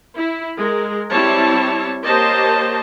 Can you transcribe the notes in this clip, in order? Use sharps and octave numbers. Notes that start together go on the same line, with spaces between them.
E4
G#3 A#4
G3 C4 E4 C#5 A5
A#3 G4 C5 C#5 D#5 A5